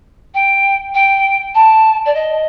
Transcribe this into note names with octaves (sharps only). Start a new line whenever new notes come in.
G5
G5
A5
D5
D#5